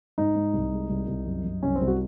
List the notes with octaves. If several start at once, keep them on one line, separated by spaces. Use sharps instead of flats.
G#2 D#4
G#2
C2
G#3
C2
C2
F#2
F#2
C2 C#4
C4
C2
F#4